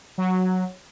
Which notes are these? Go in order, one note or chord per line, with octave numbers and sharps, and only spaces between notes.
F#3